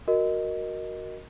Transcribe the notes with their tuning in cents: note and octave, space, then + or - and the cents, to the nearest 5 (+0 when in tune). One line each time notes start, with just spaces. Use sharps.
F#4 +0 A#4 +0 D#5 +0